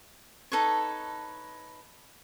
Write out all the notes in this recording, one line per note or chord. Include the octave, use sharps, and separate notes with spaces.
D#4 A4 B4 C#5